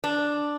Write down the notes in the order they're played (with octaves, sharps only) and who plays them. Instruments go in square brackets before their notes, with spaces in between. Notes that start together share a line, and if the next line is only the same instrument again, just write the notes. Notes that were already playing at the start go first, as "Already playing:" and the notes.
[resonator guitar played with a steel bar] D4